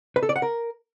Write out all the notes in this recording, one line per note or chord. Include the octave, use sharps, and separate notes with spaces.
B4
A4
D5
F#5
A#4